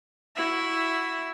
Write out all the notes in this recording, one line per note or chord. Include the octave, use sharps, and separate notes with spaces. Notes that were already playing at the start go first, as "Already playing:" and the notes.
E4 F#4 E5